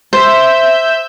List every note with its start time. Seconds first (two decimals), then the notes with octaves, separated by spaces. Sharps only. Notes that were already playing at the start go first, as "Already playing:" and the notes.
0.13 C5 E5 E6 G6